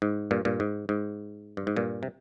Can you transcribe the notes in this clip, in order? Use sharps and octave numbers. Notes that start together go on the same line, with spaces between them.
G#2
G2 A#2
G2 A#2
G#2
G#2
G2
G#2
G2 A#2
C3